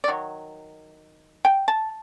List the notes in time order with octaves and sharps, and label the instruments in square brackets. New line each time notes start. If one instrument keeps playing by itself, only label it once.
[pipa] D5
D#3 F#3
G5
A5